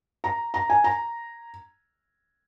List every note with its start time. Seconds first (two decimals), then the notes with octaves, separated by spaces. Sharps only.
0.24 A#5
0.54 A#5
0.70 G#5
0.84 A#5